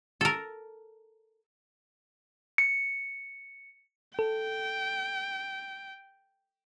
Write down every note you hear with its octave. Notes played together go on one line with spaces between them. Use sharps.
A4 A#4
C#7
A4 G5